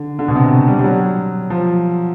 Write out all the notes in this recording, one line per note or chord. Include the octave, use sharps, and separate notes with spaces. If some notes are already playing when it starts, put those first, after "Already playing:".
Already playing: D3
D3
B2
C3
G3
G3
F#3
F3